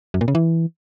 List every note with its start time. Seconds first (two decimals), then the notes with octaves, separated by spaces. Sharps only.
0.14 F#2
0.21 A#2
0.28 C#3
0.35 E3